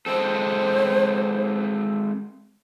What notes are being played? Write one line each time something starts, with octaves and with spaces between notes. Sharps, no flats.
G#3 C4 A4 C5